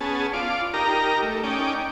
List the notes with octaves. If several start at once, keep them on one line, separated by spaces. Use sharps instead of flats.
B3 C#4 G#4 A5
F4 D5
D#4 G4 A#4 A#5
A3
C#4 D#4 D5 G5